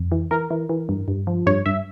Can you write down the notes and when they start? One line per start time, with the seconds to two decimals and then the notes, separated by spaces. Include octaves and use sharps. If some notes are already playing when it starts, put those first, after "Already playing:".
Already playing: F2
0.12 E3
0.31 E3 A#4
0.51 E3
0.69 E3
0.89 G2
1.08 G2
1.27 F3
1.46 G2 C#5
1.66 G2 E5